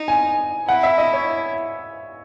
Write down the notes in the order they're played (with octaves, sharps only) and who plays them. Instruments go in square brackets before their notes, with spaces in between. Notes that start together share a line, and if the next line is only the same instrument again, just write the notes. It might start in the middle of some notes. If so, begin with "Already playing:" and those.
Already playing: [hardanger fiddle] D#4
[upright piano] G#5
[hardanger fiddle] E4 [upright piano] F#5
[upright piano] E5
D#5
C#5